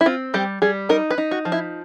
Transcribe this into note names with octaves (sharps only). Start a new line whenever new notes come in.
E4
C4 F4
G3 G4
G3 G#4
D#4 A#4
B4
D#4
F#4
F3
E4